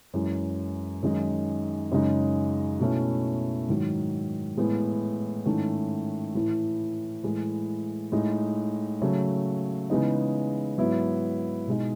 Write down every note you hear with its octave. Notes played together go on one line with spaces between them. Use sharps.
F#2 E3 G#3
F#2 D#3 G#3 D#4
F#2 C#3 G#3 D#4
B2 A3 C#4 E4
G#2 D#3 F#3
A2 E3 G#3 B3 E4
G#2 D#3 A3 C#4 E4
A2 E3 A3 E4
A2 E3 G#3
A2 G#3 D#4
C#3 F#3 A3
C#3 E3 G#3 B3 D#4
G#2 F#3 B3 E4
B2 G#3 D#4